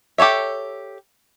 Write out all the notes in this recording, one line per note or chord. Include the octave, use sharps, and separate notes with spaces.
G4 A4 C#5 E5